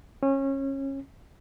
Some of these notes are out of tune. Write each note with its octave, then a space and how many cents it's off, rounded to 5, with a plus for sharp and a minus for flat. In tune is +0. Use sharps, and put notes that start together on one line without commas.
C#4 -25